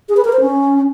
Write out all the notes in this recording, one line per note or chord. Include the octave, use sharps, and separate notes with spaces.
G#4
B4
A#4
C5
C#4